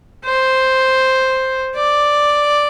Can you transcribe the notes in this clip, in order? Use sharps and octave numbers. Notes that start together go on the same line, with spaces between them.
C5
D5